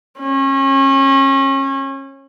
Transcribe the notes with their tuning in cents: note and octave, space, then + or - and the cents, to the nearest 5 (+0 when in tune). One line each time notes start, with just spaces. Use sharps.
C#4 -30